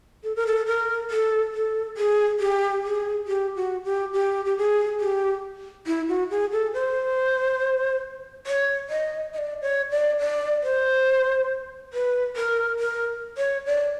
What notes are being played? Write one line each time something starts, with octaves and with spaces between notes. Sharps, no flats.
A4
A#4
A4
A#4
A4
A4
G#4
G4
G#4
G4
F#4
G4
G4
G4
G#4
G4
E4
F#4
G#4
A4
C5
C#5
D#5
D#5
D5
C#5
D5
D5
C5
B4
A#4
A#4
C#5
D5